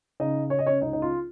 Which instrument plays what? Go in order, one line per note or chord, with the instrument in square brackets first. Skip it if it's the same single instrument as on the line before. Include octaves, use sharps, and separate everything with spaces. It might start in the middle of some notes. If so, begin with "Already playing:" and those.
[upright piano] C#3 D#4 D#5
C#3 C#5
D#5
C#4 C#5
C#2 D#4
D#4
F4